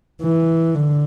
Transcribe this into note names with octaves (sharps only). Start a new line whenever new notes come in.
E3
D3